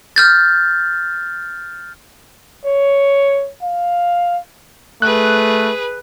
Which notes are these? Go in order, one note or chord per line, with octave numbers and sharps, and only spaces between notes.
F6 G6 A6
C#5
F5
A3 G#4 B4 F#6